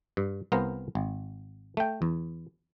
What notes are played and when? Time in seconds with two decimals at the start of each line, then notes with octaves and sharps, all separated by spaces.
0.17 G2
0.52 C2 B3 A#4 C5 F5
0.95 G#1
1.77 A3 G5
2.02 E2